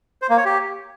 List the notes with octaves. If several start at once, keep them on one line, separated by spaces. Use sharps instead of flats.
C5
A#3
C#5
G4